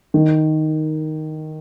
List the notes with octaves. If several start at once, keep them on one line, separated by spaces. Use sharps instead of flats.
D#3